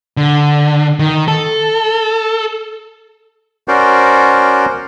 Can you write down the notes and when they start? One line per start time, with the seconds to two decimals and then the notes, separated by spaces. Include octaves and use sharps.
0.17 D3
0.99 D#3
1.28 A4
3.68 C#4 F#4 A#4 C5 D5